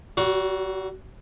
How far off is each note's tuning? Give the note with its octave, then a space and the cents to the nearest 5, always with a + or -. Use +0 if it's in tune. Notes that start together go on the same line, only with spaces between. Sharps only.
G3 -45 F#4 +0